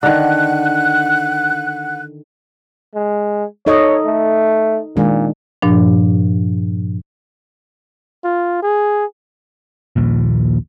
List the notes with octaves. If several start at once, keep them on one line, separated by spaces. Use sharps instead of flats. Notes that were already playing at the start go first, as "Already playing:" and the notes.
D3 D#3 F#5 F#6
G#3
D#4 A4 C#5 D#5
A3
A#2 D#3 G#3 D4
G2 A#2 F3 D4
F4
G#4
A#1 D#2 A#2